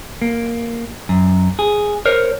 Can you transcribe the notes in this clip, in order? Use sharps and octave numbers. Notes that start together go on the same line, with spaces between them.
A#3
F#2
G#4
A#4 C5 C#5